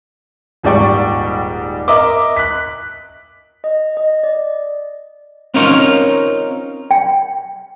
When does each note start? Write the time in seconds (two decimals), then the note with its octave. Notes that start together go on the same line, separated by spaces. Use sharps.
0.63 D#1 G#2 G3 D5 G5 C#6
1.88 A#4 D#5 E5 D6
2.36 F#6 B6
3.64 D#5
3.97 D#5
4.23 D5
5.54 C4 C#4 D#4 F4 A#4 C#5
6.91 G5